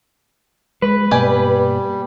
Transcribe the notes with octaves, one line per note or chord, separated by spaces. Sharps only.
G#3 B4
G2 B2 G3 A#3 G4 D5 G#5